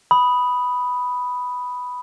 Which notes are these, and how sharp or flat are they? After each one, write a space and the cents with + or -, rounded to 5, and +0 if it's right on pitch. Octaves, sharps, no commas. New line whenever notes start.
B5 +0 D#6 +0